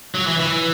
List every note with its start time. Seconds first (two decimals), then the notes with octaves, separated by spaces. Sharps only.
0.15 F#3
0.27 E3
0.40 E3